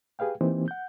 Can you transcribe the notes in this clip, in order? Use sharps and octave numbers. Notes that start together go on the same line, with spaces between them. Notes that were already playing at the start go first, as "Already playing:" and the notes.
G4 G#4 B4 F5 G5
E3 A#3 C4 D#4 G4 C5
F#5 G6